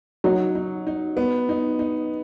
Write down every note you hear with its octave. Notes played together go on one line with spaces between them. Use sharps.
F#3 D#4
D#4
D#4
B3
D#4
D#4